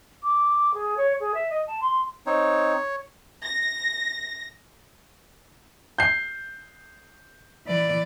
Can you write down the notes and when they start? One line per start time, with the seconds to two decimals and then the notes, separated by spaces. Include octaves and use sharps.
0.23 D6
0.73 G#4
0.97 C#5
1.20 G#4
1.34 E5
1.50 D#5
1.67 A5
1.81 C6
2.26 C4 D#4 C#5
3.43 A#6
5.98 G6 C7
7.67 E3 D5